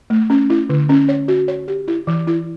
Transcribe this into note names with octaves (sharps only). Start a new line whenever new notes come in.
A3
C#4
E4
D3
C#4
C#5
F#4
C#5
G4
E4
E3
E4